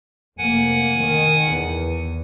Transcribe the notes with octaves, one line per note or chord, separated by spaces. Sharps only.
F1 A#3 F#5 G#5
D#3
E2